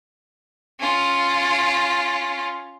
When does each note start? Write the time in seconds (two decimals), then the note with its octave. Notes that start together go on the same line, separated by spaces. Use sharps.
0.80 C#4 F4